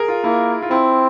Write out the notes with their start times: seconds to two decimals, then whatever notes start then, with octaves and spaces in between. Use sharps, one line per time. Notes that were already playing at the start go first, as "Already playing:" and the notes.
Already playing: G#4 A#4
0.08 F4
0.24 A#3 E4
0.62 F4
0.71 C4 E4